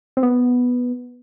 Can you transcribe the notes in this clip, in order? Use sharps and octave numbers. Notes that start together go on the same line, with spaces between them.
C4
B3